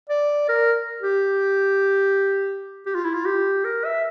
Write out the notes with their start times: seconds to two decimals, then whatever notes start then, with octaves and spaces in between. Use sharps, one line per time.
0.09 D5
0.49 A#4
1.02 G4
2.86 G4
2.95 F4
3.04 E4
3.14 F4
3.26 G4
3.65 A#4
3.85 E5